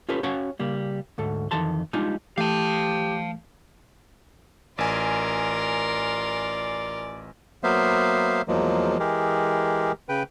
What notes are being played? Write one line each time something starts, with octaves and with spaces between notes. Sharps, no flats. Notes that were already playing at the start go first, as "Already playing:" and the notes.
C#4 F4 G4 A4 B4
C#4 F#4 C#5 F5 G5 G#5
C#3 G3 A#3
D2 G#2 A4
F2 D#3 E3 A4 A5 C6
G3 G#3 D4 D#4 F4 G#5
E3 A3 G4 F5 A5
A1 F4 A#4 D5 G#5
F#3 A#3 B3 C5 E5 F5
E2 F3 F#3 G#3 A#3
E3 G#3 G4 G#4 A#4
C#3 B4 G5